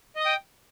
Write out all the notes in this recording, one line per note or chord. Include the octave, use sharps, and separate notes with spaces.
D#5 G5 D#6